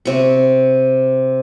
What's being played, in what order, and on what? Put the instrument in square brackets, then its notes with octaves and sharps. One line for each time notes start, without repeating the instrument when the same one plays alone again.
[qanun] C3 C#6